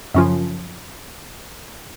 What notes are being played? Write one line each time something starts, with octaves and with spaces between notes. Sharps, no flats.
F#2 C#3 F3